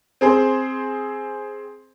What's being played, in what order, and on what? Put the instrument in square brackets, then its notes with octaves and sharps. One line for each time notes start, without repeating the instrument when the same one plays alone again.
[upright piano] C4 G#4 C5